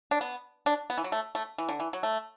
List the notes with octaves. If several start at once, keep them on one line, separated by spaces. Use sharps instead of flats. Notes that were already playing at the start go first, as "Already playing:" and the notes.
D4
B3
D4
B3
E3
F#3
A3
A3
E3
D3
E3
F#3
A3